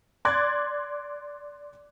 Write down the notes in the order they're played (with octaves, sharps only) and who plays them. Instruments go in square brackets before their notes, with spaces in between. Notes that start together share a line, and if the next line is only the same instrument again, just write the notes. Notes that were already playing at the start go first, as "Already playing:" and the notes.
[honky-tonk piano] D5 C6 D6 F#6 G#6 A6